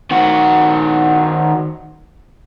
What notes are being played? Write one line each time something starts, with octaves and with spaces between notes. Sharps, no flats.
D#3 F#4